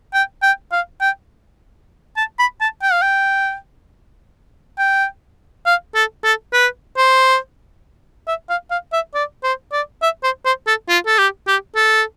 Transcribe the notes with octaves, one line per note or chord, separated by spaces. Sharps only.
G5
G5
F5
G5
A5
B5
A5
G5
F5
G5
G5
F5
A4
A4
B4
C5
E5
F5
F5
E5
D5
C5
D5
E5
C5
C5
A4
F4
A4
G4
G4
A4